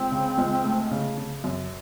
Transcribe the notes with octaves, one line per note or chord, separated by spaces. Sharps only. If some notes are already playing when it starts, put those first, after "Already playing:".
Already playing: C#2 C4
C#3
C#2
A3
C#3
C#3
F#2